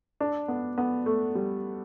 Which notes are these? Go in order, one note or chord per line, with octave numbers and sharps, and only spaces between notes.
D4
B3
B3
A3
G3